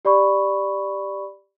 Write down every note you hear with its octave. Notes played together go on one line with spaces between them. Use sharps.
G4 D5 B5 C#6